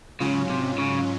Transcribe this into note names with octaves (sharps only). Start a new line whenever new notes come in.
G#2 C#3 F#3 C#4 F4
C3
C#3